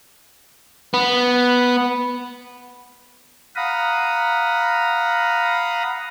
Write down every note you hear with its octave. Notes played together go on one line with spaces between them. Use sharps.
B3
F5 F#5 A#5 B5 D#6